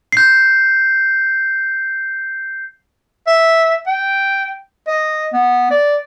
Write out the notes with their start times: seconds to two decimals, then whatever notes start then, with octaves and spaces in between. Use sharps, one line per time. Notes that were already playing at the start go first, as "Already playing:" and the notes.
0.12 G6 C7
3.27 E5
3.87 G5
4.87 D#5
5.33 B3
5.71 D5